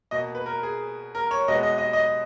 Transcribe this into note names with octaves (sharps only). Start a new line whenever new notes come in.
B2 A#3 D#5
B4
A#4
G#4
A#4
C#5
B2 G#3 B3 D#5
D#5
D#5
D#5